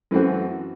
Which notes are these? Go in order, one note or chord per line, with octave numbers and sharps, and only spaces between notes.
F#2 E3 A3 C4 F#4